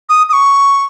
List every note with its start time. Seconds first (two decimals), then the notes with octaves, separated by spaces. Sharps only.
0.09 D#6
0.29 D#6
0.33 C#6